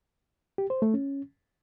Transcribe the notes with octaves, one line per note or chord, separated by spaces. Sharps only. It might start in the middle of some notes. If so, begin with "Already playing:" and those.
G4
C5
A3
C#4